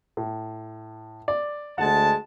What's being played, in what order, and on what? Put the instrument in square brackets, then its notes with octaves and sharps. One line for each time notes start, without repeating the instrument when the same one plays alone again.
[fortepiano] A2
D5
[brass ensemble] D2 G#3 A5 [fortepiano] F#5